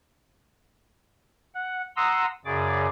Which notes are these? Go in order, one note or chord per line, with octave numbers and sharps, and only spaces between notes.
F#5
F#5 A#5 C6 D#6 E6
F#2 C#3 G#4 D5 D6